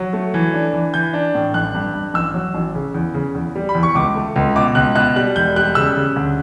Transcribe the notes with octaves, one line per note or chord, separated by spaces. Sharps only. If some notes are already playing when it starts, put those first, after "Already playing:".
Already playing: F#3
A3
E3
D4
E3
E3 G6
D4
A2
A1 F#6
G2
G2
A1 E6
F#3
A1
C#3
E2
C#3
E2
G3
B5
E2
C#6
C#2 D6
A3
C#2
B2 D6
C#2 F#6
B2 F#6
G3 F#6
E1 G6
G3 F#6
C#3 E6
C#3
D2